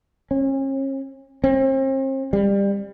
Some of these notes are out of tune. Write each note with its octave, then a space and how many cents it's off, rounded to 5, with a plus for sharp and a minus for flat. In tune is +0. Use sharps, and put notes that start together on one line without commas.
C#4 -40
C4 +40
G3 +25